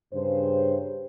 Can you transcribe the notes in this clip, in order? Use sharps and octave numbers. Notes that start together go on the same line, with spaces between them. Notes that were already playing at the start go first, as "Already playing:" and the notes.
G2 C#3 C5